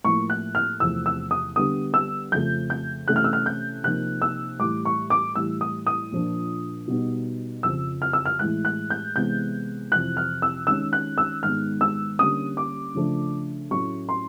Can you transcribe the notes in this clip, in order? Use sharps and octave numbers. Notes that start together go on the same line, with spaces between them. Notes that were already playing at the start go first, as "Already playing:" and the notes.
A2 F3 A#3 C#6
F#6
F6
E2 C3 F3 A3 E6
E6
D#6
D3 G3 B3 D#6
E6
F2 C#3 F3 A3 G6
G6
C3 E3 A3 C#4 F#6
F6
E6
F6
G6
C3 F3 A#3 D#4 F#6
E6
A2 E3 G3 D6
C#6
D6
A2 E3 G3 E6
D#6
D#6
A#2 F3 A#3 D4
B2 G3 B3 D#4
F2 C#3 F3 E6
F6
E6
F6
A2 E3 G#3 F#6
F#6
G6
C3 E3 G#3 B3 G6
F2 C3 E3 F#6
F6
E6
D#3 G#3 C#4 E6
F#6
E6
G#2 D#3 G#3 B3 F6
E6
D3 G3 A#3 C#4 D#6
D6
C#3 F3 A3 D4
A2 F#3 A3 C#4 C#6
C6